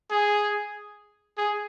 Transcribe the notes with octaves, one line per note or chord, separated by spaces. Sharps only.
G#4
G#4